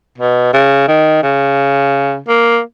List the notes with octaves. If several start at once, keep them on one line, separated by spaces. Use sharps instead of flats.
B2
C#3
D#3
C#3
A#3